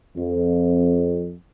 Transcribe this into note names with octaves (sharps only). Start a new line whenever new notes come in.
F2